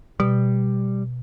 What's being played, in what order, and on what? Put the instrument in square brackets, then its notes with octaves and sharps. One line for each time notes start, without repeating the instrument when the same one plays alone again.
[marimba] B2 [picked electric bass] G3